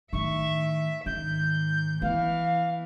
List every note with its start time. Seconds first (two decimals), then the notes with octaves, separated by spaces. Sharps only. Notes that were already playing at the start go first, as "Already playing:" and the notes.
0.13 A2 D#3 E5 C#6
1.06 G#2 D#3 G6
2.02 E3 B3 F5